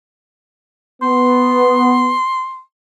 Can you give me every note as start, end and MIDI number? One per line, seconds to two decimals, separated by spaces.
1.02 2.15 59
1.02 2.61 84